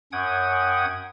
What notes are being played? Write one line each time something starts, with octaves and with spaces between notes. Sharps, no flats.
F#2 C#4 F#5 G5 D#6 G#6